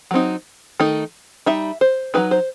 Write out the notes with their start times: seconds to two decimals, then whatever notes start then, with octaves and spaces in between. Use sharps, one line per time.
0.11 F#3 C4 D#4
0.80 D#3 A3 D#4
1.46 G3 D#4 E5
1.81 C5
2.14 F#3 C4 D#4 B4
2.31 C5